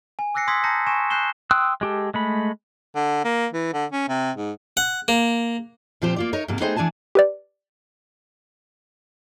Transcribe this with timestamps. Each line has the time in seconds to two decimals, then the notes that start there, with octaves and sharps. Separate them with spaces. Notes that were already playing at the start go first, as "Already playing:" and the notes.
0.19 G#5
0.35 D6 E6 F#6 A#6 C7 C#7
0.48 C6 D#6 E6 G#6 B6
0.64 A5 A#5 G6 A#6 C7 C#7
0.87 G#5 C6 C#6 A#6 E7
1.10 F#6 G6 C7 E7 G7
1.51 G5 C6 D#6 E6 F#6
1.81 G#3 G4 A4
2.14 G#3 A3 B5
2.96 D3
3.24 A#3
3.54 E3
3.74 D3
3.92 C#4
4.09 C3
4.37 G#2
4.77 F#5
5.08 A#3
6.02 A#2 F3 C4 G4 C5
6.16 A#3 F4 D5
6.33 D#4 A#4 C#5
6.48 G#2 C3 A#3
6.60 A3 B3 D#4 G#4 C5 G5
6.76 E3 D4 G#4 G#5 A5
7.15 G4 B4 D5